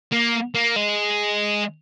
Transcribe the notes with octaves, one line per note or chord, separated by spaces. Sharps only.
A#3
A#3
G#3